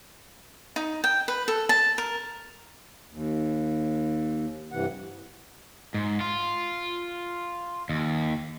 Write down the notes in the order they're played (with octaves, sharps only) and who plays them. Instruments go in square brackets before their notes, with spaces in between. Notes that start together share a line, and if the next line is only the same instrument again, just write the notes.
[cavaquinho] D#4
G5
B4
A4
A5
A#4
[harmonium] D#2
G2 C3 E3 F#5
[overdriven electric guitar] G#2
F4
D#2